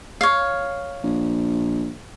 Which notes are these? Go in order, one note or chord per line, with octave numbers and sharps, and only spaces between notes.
C#5 F5
A#1